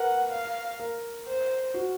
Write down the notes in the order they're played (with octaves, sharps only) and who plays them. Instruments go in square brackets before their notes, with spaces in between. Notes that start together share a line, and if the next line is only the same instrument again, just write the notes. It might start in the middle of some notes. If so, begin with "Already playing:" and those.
Already playing: [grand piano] A#4 B4 [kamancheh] F#5
[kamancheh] F5
[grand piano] A#4
[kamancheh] C5
[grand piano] F#4